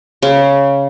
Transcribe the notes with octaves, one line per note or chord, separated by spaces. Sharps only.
C#3